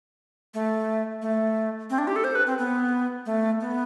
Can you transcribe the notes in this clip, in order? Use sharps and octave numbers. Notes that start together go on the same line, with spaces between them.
A3
A3
C4
D4
G4
A4
C5
B4
C4
B3
A3
B3